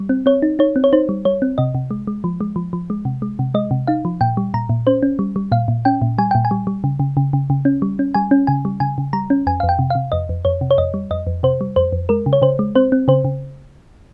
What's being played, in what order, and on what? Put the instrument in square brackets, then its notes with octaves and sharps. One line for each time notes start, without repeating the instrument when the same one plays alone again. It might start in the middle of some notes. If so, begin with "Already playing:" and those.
Already playing: [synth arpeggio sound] G3
C4
C4 C#5
D#4
D#4 C#5
C4
C#5
D#4 C5
G3
G3 C#5
C4
C3 D#5
C3
G#3
G#3
F3
G#3
F3
F3
G#3
C3
G#3
C3
G#3 D#5
C3
D#4 F5
F3
A#2 G5
G3
A#2 A#5
A#2
C#4 C5
C#4
G3
G3
A#2 F5
A#2
C#4 G5
A#2
G3 G#5
A#2 G5
G#5
G3
G3
C#3
C#3
C#3
C#3
C#3
C#4
G3
C#4
G3 G#5
C#4
C#3 G#5
G3
C#3 G#5
C#3
G3 A#5
C#4
F2 G#5
F2 F5
G5
C3
F5
C3
F2 D#5
F2
F2 C#5
C3
C#5
F2 D#5
G3
F2 D#5
F2
C3 C5
G3
F2 C5
F2
G#3 A#4
C#3
C#5
C#3 C5
G#3
C4 C5
C4
C#3 C5
C#3